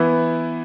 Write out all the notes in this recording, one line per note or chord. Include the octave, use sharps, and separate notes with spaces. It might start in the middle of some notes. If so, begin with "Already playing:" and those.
Already playing: E3 B3 E4